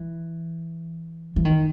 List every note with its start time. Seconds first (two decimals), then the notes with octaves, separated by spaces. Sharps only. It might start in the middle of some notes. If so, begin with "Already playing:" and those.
Already playing: E3
1.36 E3
1.45 D#3